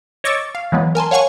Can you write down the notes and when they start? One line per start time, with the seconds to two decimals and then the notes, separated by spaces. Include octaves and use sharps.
0.24 C#5 D#5 C#6 D6 E6 A6
0.55 F5
0.72 E3 F#3 G#3 B3
0.95 A#4 G#5 A5 C6
1.11 C#5 F5 F#5 G#5 C#6